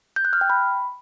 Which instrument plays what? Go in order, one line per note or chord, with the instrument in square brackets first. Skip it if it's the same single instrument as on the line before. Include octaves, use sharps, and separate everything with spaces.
[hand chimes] G6
F#6
F6
G5
B5